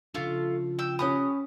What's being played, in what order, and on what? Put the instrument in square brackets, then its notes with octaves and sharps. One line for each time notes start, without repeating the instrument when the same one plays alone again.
[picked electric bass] C#3 D4 [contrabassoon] F3 [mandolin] A3 F4
[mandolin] G5 E6
[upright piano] C#4 G#5 B5 [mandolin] F#4 G4 D#6